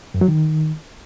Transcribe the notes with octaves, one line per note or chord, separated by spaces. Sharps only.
F#2
F#3
D#3